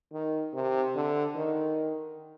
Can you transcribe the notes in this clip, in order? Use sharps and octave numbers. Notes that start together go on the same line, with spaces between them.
D#3
C3
D3
D#3